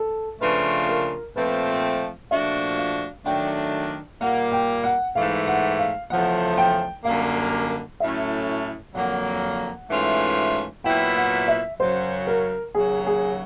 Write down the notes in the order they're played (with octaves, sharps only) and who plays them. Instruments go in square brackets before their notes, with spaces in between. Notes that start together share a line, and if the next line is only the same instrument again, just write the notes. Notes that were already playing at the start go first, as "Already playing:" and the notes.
Already playing: [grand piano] A4
[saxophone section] C#3 F3 A3 D4 F4 [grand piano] B4
[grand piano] A#4
[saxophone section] A#2 F3 A3 C4 [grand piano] B4
[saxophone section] A#2 F3 A3 D4 F#4 [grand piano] E5
[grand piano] F5
[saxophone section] D#3 F#3 A3 D4 [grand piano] G5
[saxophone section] A#2 G3 A#3 [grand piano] F#5
[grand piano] G5
F#5
[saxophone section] G#2 E3 A3 [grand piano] F5
[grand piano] F#5
F5
[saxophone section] E2 C#3 F3 A3 [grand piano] F#5
[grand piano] G5
[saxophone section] F#2 D3 G3 A#3 [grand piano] F5
[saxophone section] A2 F#3 A3 C#4 E4 [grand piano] E5
[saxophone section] F2 D3 F#3 A#3 [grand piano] F#5
[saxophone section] G#2 E3 A3 C#4 F4
[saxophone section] A#2 F#3 B3 E4 [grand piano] G5
[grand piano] F#5
E5
[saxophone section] F#2 C#3 F#3 [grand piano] C5
[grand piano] A#4
[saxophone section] D#2 C#3 F#3 [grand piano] G#4
[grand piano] G#4